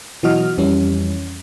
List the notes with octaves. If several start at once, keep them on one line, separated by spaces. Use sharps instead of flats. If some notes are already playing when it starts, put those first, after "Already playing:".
B2 E3 F#3 F#4 D#5 F6
F2 E3 G3 C#4